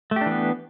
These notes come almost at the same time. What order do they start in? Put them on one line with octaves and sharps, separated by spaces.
A3 G4 D4 E3 B3